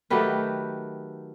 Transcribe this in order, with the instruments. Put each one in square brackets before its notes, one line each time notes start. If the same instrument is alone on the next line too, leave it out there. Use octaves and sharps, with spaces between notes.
[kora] D#3 F#3 A3 G4 B4